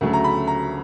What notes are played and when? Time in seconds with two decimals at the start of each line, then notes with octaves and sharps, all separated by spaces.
0.01 D2 C#3 F#3 A3
0.13 A#5
0.24 B5
0.47 A#5